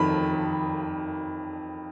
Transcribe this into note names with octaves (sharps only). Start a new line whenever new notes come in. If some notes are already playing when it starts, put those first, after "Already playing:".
Already playing: F2 D#3 B5